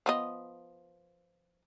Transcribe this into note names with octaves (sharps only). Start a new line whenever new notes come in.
F3 B3 D#5